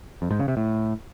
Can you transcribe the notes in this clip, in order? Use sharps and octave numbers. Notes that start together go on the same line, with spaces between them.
F2
G#2
C#3
C3
A2